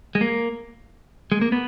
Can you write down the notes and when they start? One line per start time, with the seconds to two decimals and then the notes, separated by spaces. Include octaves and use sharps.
0.15 G#3
0.21 A#3
1.32 G#3
1.41 A#3
1.52 B3